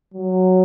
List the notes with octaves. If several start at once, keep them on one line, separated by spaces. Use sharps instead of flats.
F#3